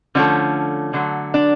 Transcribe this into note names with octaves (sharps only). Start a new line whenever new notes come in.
D3 F3 A3 C#4
D3 F#3 A3
D4